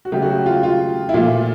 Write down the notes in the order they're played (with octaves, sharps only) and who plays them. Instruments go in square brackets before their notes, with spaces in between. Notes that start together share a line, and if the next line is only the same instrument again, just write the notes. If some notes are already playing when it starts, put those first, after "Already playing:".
[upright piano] F#4
C#3 F#3 A3 G4
F#4
G4
F4
F4
E4
A#2 F3 A3 F4